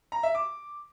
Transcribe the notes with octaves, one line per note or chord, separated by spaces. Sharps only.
A#5
E5
D6